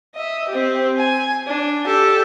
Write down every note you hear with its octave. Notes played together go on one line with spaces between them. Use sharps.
D#5 E5
C4 G4
G#5
D4
G4 A4